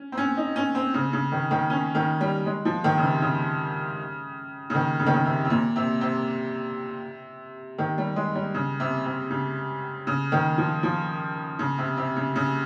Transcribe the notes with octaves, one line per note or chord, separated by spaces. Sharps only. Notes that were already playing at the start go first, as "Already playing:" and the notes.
Already playing: C#4
C4
C#4
D#4
C#4
C4
C#3
C#3
D#3
D#3
C#4
D#3
G3
G#3
F3
D#3
C#3
C3
C#3
C#3
D#3
C#3
D#3
C#3
C3
C3
A#2
C3
C3
D#3
G3
G#3
G3
C#3
C3
C3
C#3
C#3
D#3
F3
F3
C#3
C3
C3
C#3
C#3